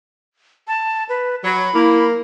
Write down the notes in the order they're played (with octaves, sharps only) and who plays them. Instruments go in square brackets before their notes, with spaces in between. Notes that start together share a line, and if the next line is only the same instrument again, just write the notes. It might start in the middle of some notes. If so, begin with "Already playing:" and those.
[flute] A5
B4
[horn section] F#3 [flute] B5
[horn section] A#3 [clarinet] E4